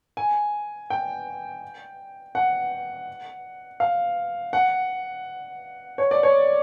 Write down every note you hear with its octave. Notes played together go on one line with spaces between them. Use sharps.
G#5
G5
F#5
F5
F#5
C#5
D5
C#5